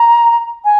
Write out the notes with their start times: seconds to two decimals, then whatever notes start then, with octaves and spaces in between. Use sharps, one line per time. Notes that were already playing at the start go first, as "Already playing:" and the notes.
Already playing: A#5
0.65 G#5